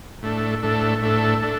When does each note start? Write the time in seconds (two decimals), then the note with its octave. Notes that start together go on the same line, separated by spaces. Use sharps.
0.23 A2 A3 D4 A4
0.63 A2 A3 D4 A4
1.02 A2 A3 D4 A4
1.42 A3 D4 A4